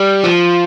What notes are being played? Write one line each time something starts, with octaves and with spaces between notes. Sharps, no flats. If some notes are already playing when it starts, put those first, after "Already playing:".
Already playing: G3
F3